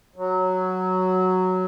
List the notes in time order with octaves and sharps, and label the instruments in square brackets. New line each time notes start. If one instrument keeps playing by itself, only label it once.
[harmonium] F#3